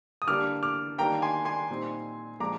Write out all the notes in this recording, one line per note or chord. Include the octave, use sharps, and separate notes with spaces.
D#6
D3 G3 A#3 D4 D6 F6
D6 F6
D#3 G3 A#3 D4 G5 A#5
G#5 C6
G#5 C6
A#2 G3 C4 D#4
A#2 F3 G#3 D4 A#5 D6